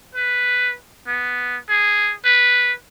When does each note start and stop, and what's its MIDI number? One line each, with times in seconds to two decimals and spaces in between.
0.15 0.74 71
1.07 1.57 59
1.69 2.15 68
2.25 2.72 71